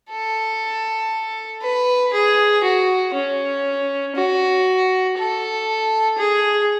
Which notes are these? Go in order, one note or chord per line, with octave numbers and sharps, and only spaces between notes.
A4
B4
G#4
F#4
C#4
F#4
A4
G#4